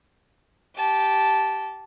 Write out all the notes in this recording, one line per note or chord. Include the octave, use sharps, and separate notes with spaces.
G4 A5